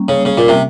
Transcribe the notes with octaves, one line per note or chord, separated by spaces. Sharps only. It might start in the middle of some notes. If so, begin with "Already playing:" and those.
Already playing: G3 A#3 C#4
C#3
C#3
A#2
C3